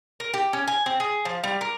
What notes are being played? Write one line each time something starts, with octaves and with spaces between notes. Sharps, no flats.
A#4
G4
C#4
G#5
C4
G#4
F3
G3
A#4